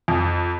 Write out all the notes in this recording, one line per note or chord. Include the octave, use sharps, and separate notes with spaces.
F2